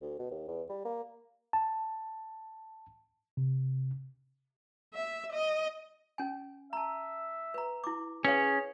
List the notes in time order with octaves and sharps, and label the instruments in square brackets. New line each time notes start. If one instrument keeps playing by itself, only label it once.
[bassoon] D2
B2
D#2
E2
G3
A#3
[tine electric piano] A5
C3
[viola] E5
D#5
[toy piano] C#4 G#5
[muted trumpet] E5 [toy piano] A5 A#5
[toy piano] B4 A#5
E4 D6
[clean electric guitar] C#4 [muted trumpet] G#4 [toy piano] B4 C#5 F5